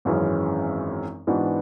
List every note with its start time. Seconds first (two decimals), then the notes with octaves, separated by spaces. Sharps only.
0.05 G#1 F#2 E3 G#3 C#4
1.27 G#2 E3 B3 D4 F#4